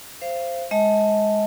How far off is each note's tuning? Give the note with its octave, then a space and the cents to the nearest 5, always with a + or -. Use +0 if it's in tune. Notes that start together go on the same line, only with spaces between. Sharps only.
C5 +0 F5 -30
G#3 +0 D#5 +40 A5 +0